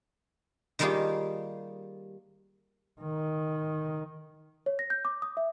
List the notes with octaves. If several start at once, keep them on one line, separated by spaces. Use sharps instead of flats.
D#3 G3 A#3 F4 G4 G#4
D#3
C#5
A#6
G6
D6
D#6
E5